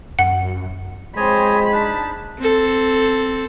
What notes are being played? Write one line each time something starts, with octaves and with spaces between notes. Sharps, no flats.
F#2 F#5
G#3 C4 C5 C#5 D#5 G#5 B5
D4 D#4 A5
C4 A4